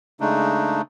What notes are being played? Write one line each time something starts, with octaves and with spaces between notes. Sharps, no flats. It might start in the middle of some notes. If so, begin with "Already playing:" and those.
C#3 G#3 A3 D4 D#4